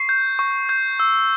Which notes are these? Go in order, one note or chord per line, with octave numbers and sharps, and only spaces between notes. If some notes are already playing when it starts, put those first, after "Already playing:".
Already playing: C#6 C7
G6
C#6
G6
E6